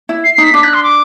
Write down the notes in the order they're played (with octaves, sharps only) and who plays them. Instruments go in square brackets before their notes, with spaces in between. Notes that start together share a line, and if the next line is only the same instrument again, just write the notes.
[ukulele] E4
[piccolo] C7
C7
[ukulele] D#4
[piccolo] B6
[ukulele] D4 [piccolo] B6
[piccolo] F#6
C6
D6